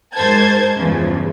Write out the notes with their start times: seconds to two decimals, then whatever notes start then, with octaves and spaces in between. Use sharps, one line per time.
0.14 G#2 A#4 C5 A5 G#6
0.76 E2 G2 C#3 E3 F3